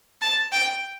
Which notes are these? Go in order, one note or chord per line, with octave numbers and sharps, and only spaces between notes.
A5
G5